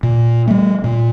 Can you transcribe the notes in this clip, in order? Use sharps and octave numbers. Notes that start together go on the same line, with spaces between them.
A#2
G3 A3
A#2